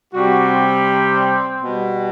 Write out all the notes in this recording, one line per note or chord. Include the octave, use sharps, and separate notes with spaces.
C3 G3 F#4
C4
B2 G3